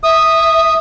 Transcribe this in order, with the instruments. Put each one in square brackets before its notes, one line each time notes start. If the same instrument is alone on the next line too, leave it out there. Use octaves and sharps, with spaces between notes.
[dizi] E5 [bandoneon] D#6